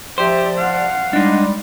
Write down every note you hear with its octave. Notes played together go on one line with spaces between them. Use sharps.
F3 G4 C5 D5 E5
F5 F#5
G3 G#3 D4 D#4